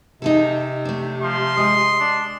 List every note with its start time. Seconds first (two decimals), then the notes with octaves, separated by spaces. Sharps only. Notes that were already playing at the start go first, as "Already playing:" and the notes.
0.22 C3 D#4 G#4 A4
0.85 A3 D4
1.23 F3 C6
1.57 G#3 D#5
2.00 D4